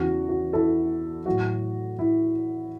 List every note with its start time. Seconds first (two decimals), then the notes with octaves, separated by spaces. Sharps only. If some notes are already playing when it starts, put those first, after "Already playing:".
Already playing: E2 C#3 E3 F#4
0.29 F#4
0.53 E4 A4
1.26 A2 F#3 F#4
1.99 E4